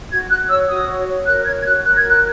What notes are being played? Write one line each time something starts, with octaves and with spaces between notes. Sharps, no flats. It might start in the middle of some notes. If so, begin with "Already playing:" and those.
F#4 G#6
F#4 F#6
C#5 E6
F#4 D#6
C#5
C#5
A#4 F#6
C#5 G#6
G#6
F#4 F#6
A#4 F#6
G#6
F#4
F#6